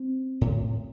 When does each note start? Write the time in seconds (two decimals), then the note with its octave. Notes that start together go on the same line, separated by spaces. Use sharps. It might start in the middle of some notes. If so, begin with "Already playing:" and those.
Already playing: C4
0.41 A2